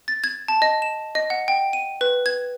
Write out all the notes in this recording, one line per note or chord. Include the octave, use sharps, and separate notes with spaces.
A6
G#6
A5
D#5
E7
D#5
F#5
G5
D#7
B4
G#6